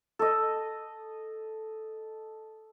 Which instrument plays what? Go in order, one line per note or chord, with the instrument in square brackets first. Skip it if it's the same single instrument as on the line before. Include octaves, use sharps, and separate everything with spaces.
[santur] A4 D#5